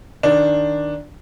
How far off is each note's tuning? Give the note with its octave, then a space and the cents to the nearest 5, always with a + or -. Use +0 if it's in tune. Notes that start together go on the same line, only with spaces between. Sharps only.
D#3 +0 D4 +0